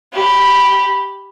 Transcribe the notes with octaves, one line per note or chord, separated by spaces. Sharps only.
G4 B5